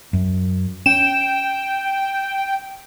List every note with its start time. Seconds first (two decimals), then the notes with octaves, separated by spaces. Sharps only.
0.13 F#2
0.86 C#4 G5 E7